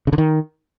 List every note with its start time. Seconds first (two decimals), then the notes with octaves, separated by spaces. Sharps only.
0.07 C#3
0.13 D3
0.18 D#3